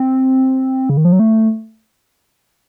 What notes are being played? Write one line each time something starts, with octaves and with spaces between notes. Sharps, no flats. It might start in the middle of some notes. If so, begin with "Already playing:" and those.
Already playing: C4
C#3
D#3
F3
F#3
A3